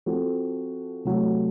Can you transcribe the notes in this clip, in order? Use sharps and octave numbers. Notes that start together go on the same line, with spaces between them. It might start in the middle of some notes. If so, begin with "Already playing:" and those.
F3 C4 F#4 A4
C3 F#3 A3